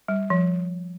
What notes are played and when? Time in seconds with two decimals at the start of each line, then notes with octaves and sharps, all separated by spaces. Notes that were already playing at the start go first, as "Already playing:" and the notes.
0.08 G3
0.30 F3